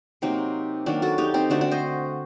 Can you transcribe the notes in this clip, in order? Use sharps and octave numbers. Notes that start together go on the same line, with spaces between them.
C3 F#3 A#3 C4 D#4
D#3 F#3 A#3 D4 F#4
F#4 A4
D#4 G4
C4 D#4
D3 A3 D4 F#4
D4 F#4
C5 D#5